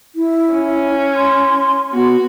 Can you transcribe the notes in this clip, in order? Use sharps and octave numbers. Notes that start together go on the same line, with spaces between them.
E4
C#4
C6
B3 F#4